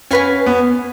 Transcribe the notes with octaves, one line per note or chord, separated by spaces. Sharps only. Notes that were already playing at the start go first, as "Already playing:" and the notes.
C#4 F#4 B4 F5 G#5
B3